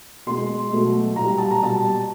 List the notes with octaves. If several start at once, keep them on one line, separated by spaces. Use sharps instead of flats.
B2 G#3 C6
B2 F#3 A3
A#2 G3 A#5
A5
A#5
B2 G3 A5